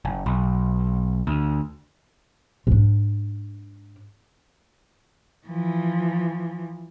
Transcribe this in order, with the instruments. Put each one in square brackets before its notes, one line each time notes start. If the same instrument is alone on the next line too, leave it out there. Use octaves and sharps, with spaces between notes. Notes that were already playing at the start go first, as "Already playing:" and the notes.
[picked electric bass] F#1
B1
D2
[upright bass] G#2 D4
[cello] E3 F3